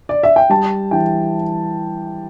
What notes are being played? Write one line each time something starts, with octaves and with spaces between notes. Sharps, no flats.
D5
E5
G5
G3 A5
E3 G5